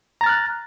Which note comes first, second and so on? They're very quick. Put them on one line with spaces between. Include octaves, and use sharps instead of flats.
A#5 A6 F6 F#6